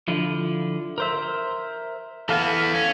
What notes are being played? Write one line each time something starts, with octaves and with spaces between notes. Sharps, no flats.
D3 F3 E4
A#4 C5 E5
E3 B3 A4 F5
C#4